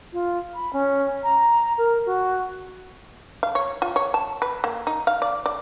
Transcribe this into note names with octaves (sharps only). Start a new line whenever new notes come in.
F4
B5
C#4
A#5
A#4
F#4
F5
C#5
F4
C#5
A5
B4
A#3
D#4
F5
D5
D5